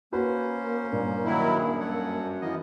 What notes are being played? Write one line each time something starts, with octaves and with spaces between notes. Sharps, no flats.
A#3 C#4 F#4 B4 C5
G2 A#2
D#3 F#3 E4
F#2 G#4
A4 C#5 F#5
E3 A#3 B3 D#5